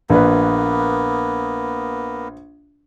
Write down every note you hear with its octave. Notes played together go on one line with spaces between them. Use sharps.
A#1 A#3 B3 B4